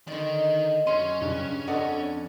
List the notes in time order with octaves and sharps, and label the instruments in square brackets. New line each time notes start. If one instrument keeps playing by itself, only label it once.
[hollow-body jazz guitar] D3 D5 [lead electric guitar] D#3 [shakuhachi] D#5
[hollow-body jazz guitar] F#2 C6 [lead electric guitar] C#4 [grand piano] D#7
[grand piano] G2 C#3 D4
[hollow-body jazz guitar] F2 D#5 [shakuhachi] D4 [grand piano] A4 D5 F#5